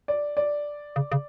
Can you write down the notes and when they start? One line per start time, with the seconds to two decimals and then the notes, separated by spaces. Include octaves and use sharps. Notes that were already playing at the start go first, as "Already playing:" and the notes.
0.08 D5
0.37 D5
0.96 C#3
1.12 C#3